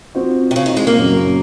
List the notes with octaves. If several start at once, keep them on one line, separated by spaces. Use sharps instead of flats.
F3 C4 F#4
C3
C#3
D#3
G#3
A#3
F#2 C#3 F#3